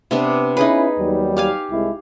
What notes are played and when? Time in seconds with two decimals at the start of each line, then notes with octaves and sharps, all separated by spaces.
0.11 C3 B3 D4
0.57 C#4 D#4 E4 G#4 B4
0.98 D#2 F#3 G3
1.37 G4 F5 G#5
1.70 C2 G#3 E4